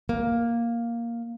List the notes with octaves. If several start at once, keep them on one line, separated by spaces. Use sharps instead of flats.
A#3